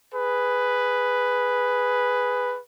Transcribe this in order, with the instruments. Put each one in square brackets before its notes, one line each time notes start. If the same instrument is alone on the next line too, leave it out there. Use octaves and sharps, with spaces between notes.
[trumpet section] G#4 B4